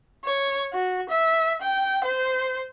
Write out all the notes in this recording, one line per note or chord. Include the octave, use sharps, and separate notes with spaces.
C#5
F#4
E5
G5
C5